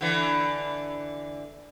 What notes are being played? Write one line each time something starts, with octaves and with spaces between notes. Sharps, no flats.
D3 E3